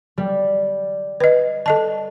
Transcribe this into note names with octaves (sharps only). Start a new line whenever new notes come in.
G3
B4 D#5
A4 D#5 A5